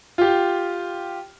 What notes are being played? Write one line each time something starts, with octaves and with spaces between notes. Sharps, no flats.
F4 G4